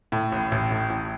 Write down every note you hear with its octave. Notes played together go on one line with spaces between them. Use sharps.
A2
A1
A1
A2
A1